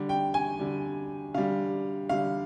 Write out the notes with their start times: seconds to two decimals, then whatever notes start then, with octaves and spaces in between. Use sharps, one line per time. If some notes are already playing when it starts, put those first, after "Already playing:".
Already playing: D3 G3
0.09 G5
0.34 G#5
0.59 D3 G3
1.34 D3 G3 F5
2.09 D3 G3 F5